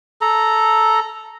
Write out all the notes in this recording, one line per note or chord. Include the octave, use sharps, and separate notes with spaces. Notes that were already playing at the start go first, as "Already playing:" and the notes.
A4 A#5